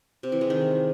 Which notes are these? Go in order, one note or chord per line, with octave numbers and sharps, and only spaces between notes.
C3
E3
G#3
D#3